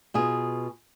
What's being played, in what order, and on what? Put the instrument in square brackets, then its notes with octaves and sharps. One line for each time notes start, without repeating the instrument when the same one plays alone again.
[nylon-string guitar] B2 F4 G#4